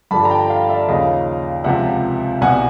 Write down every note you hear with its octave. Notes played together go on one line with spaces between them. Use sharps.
G2 D3 F3 A5 B5
A#5
G5 A5
F5 G5
D5 E5
D#2 C#3 F3 D#5 F5
C#2 C3 F3 E5 F#5
C2 B2 F#5 G#5